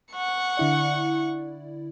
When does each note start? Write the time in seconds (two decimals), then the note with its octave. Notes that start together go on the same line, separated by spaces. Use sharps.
0.14 F#5 C#6
0.57 D3 E4 D5